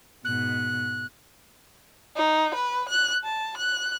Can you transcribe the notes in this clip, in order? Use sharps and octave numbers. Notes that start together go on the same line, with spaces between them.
G#2 B2 F#6
D#4
B4
F#6
A5
F#6